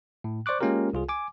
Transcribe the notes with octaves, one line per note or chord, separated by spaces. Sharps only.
A2
C5 D5 C#6 D6 F#6
G#3 A#3 C#4 F4 G4 A#4
C2 F4 G#4
G#5 D6